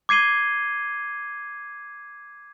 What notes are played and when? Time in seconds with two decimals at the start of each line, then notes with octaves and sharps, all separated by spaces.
0.09 D6 G#6 C7 D#7 G7